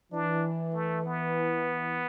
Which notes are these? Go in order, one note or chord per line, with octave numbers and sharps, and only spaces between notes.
E3 D4
A3
B3